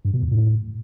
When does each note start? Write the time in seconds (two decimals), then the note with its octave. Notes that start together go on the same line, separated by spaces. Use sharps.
0.05 G2
0.14 B2
0.23 E2
0.31 A2